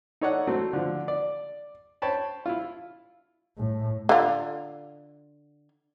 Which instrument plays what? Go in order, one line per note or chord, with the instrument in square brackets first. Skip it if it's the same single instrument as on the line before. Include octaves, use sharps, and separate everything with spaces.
[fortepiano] D#4 A4 C#5 D5 F#5
F#3 A3 C4
D3 F3
D5
C5 C#5 G5 A5 B5
E4 F4
[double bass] A2
[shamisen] D3 F4